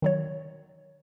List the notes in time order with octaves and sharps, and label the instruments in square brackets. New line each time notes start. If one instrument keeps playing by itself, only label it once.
[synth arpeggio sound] D#3 F#3 C#5